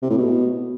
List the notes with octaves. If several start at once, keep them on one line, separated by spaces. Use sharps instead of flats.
C3
A2
B2